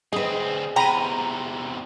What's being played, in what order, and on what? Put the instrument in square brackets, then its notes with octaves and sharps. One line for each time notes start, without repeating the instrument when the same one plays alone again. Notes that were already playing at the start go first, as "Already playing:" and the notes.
[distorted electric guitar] D2 C4 [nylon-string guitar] G#4 B4 [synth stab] D#5
[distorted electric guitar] E2 C3 [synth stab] G5 B5 D#7 [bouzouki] A#5